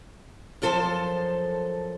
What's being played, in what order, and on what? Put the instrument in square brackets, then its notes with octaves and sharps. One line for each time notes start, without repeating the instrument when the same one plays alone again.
[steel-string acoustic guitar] F#2 F3 A4 C5 A5